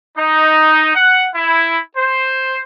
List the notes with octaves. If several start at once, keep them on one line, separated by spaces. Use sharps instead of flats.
D#4
F#5
E4
C5